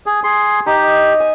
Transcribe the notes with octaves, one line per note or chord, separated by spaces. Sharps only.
G#4
G#4 C6
D#4 G4
G#5